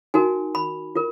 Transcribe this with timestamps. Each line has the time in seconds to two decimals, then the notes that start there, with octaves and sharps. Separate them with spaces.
0.14 D#4 F#4 A#4 G#5
0.55 B5
0.95 F4 A#4